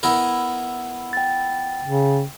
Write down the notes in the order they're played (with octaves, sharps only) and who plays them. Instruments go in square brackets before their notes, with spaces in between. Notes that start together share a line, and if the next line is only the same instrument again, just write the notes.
[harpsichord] B3 E4 A#4
[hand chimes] G5 A6
[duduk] C#3